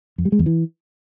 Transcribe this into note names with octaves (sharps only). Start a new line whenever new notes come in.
F2
G3
G#3
E2
E3